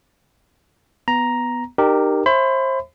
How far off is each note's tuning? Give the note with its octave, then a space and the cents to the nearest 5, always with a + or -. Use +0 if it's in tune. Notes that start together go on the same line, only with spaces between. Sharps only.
B3 +0 A#5 +5
D#4 -35 G4 +0 A#4 +0
C5 +30 E5 +5 B5 +35